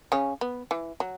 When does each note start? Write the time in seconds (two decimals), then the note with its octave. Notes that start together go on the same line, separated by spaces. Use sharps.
0.12 C#3 C#4
0.41 B3
0.71 E3
1.00 F#3